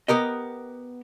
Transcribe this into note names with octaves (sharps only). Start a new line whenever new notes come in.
B3 G4 A#4 D#5